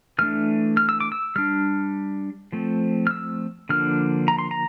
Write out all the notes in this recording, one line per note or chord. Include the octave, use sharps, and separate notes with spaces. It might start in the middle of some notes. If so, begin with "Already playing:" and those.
E3 A3 D4 F6
F6
E6
D6
E6
G3 D4 F6
F3 A3 C4
F6
E6
D3 F3 A#3 D4 F6
A#5
C6
A#5